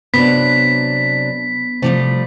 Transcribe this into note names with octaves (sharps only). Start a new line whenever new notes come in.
C3 F#3 B3 D4 B6
C3 F3 G3 A3